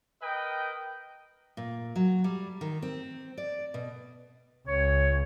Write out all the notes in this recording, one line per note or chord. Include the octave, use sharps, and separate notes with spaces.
A#4 B4 D#5 G5
A#2
F#3
G3
D#3
C4
D5
B2
C#2 C#5